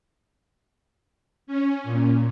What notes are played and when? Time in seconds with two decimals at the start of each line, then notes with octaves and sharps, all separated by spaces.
1.47 C#4
1.84 A#2